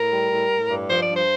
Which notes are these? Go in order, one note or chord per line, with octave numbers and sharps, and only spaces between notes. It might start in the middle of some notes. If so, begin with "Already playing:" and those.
Already playing: A2 A#4
G3
A2
A2
G2
F3 C5
G2 D5
C5